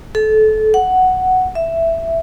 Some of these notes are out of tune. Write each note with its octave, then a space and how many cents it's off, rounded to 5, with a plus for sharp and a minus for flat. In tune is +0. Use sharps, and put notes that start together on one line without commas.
A4 -25
F#5 +5
E5 +5